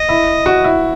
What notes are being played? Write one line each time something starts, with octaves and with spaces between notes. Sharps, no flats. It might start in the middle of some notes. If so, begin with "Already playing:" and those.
Already playing: D#5
E4
F#4
E4